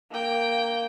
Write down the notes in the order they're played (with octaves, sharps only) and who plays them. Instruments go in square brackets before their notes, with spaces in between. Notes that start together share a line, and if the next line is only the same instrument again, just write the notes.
[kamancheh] A#3 G5